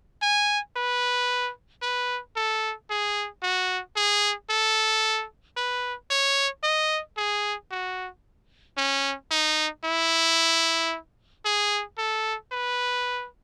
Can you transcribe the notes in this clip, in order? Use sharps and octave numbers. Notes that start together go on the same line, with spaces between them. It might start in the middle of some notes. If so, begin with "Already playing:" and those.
G#5
B4
B4
A4
G#4
F#4
G#4
A4
B4
C#5
D#5
G#4
F#4
C#4
D#4
E4
G#4
A4
B4